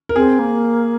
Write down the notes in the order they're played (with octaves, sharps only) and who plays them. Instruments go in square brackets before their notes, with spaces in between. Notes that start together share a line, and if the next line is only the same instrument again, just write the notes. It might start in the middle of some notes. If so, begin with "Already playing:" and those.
[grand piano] A#4
[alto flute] C4 [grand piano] G#4
[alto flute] A#3